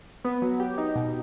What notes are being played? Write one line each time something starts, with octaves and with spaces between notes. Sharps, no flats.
B3
F#3
G4
D#4
B2